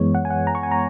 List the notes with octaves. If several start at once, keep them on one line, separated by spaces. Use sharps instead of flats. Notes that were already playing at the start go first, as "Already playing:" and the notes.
Already playing: F#2 E3 G#3 B3 C#5
F#5
G#5
F#5
A#5
C#6
G#5
A#5